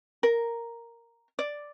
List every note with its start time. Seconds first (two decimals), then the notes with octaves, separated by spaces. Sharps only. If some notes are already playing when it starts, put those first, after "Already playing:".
0.23 A#4
1.39 D5